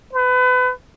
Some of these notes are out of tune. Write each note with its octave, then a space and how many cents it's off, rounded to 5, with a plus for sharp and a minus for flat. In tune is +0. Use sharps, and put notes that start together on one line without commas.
B4 +30